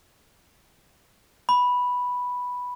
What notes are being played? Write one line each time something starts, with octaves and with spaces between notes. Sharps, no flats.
B5